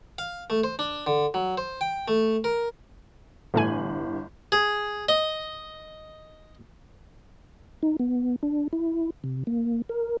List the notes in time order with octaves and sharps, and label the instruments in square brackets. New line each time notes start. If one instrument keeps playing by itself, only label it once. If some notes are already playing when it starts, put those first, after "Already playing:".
[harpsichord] F5
A3
C5
D4
D3
F#3
C5
G5
A3
A#4
[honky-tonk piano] G1 E3 F#7 [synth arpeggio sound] A2 A3 G#5
[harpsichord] G#4
D#5
[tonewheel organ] D#4
B3
D4
E4
C3
A#3
A#4